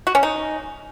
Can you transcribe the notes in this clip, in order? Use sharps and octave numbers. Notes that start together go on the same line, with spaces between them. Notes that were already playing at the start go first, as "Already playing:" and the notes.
F#4
C#4
D#4